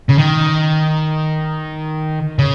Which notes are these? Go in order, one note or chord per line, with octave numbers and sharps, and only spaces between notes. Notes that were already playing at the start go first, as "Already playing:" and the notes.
C#3
D#3
C#3